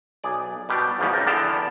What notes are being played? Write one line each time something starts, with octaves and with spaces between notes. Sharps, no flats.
B1 G#4 D5
B2 G3 D4 G4
E2 G#2 B2 F3 G3 B3
C#2 G4 A#4 A5
E2 D3 B3 G4 F5 A5